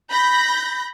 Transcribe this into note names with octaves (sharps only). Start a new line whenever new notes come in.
B5 G6 A#6